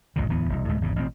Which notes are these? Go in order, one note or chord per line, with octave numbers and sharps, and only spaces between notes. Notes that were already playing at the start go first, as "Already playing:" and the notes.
G1 C#2 A#2 D#3
D1 E2 E3 B3
E1 C2
D2 A2 G#3 A3
G#1 E2 C#3
A1 B2 D3 C4